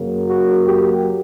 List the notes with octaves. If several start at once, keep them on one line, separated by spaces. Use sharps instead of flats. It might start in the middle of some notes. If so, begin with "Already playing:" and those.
Already playing: F#2 C#3 F#3 A#3
F#4
G4